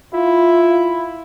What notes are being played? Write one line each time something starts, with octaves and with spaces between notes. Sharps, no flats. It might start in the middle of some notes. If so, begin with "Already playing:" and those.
E4 F4